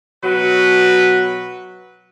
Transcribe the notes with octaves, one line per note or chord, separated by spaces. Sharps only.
B2 F#3 F#4 B4